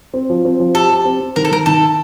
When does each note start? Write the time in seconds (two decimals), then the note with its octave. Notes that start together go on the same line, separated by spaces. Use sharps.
0.14 C4
0.30 F3
0.45 C4
0.60 F3
0.75 G4 A4
0.90 G4
1.05 C4
1.20 C4
1.36 D#3 A#4
1.45 A4
1.51 D#3 A#4
1.66 D#3 A4